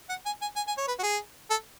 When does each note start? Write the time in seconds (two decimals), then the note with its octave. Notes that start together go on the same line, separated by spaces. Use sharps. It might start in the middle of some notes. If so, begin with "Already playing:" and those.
0.09 F#5
0.26 G#5
0.41 G#5
0.56 G#5
0.67 G#5
0.77 C#5
0.88 B4
0.99 F#4
1.03 G#4
1.50 A4